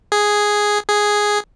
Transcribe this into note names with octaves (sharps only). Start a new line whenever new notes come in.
G#4
G#4